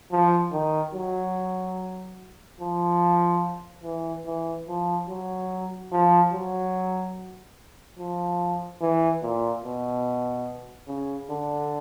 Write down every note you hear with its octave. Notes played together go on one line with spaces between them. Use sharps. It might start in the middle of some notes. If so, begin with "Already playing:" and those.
F3
D#3
F#3
F3
E3
E3
F3
F#3
F3
F#3
F3
E3
A#2
B2
C#3
D3